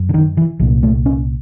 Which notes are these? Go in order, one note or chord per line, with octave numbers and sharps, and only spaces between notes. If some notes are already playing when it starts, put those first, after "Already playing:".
Already playing: F#2
D3
D#3
E3
C2 A#2 F3
A3
C#4